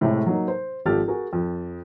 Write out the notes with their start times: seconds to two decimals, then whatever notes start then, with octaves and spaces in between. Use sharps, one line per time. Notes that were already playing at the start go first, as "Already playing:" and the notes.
0.01 A2 C3 G#3 A3
0.26 F#3 A#3 D#4
0.48 C5
0.86 G#1 F3 G4 A4 F6 A6
1.08 F#4 G#4 A#4
1.33 F2